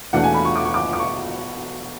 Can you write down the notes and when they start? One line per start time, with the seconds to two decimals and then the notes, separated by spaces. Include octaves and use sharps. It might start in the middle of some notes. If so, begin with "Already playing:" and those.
0.13 E2 B2 A3 D4 F#5
0.24 G#5
0.34 B5
0.45 C#6
0.56 D6
0.65 C#6
0.74 D6
0.93 D6
0.99 C#6